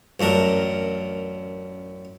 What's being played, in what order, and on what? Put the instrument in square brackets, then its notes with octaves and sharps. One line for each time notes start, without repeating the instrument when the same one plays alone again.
[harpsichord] A1 F#2 D4 A#4